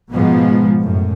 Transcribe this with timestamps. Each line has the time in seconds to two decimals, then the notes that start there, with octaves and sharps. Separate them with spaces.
0.11 G#2 B2 F3 G#3 B3
0.80 F#2 A2